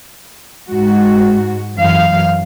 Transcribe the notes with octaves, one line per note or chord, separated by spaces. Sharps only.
G#2 F#4
F#2 E3 F5